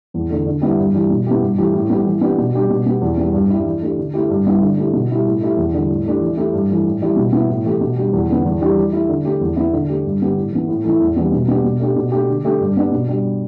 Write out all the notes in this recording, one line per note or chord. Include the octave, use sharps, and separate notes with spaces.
E2
D3 A3
D3
G3 B3 E4
G2
E3 G3
B2
B3 E4 G4
G2
E3 A3 E4 G4
A2
G3 B3 E4 G4
E3
B3 D4 G4
B2
G3 D4 G4
B2
B3 G4
E2
E3 G3 B3
G2
G3 E4
E3
A3 D4 G4
D3
A3 E4 G4
G2
G3 B3 E4 G4
D3
A3 E4 G4
B2
G3 E4 G4
A2
A3 E4 G4
E2
D3 G3
A2
A3 D4 G4
E3
A3 E4 G4
G2
E3 A3
A2
E3 G3 E4 G4
B2
B3 E4
A2
E3 A3 G4
B2
G3 D4 G4
E2
D3 B3
E2
E3 G3 D4 G4
E3
A3 E4 G4
D3
A3 G4
E2
E3 B3 E4
D3
A3 G4
G2
D3 B3 G4
A2
E3 B3
A2
E3 A3 E4
E2
E3 G3 B3 D4
B2
B3 D4 G4
B2
A3 D4 G4
B2
A3 D4 G4
D3
A3 D4 G4
G2
G3 B3 D4
B2
G3 D4 G4